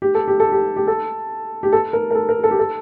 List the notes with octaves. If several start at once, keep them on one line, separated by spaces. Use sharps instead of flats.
G4
A4
G4
A4
G4
G4
A4
G4
A4
A#4
A#4
A4
A#4
A4
G4
A4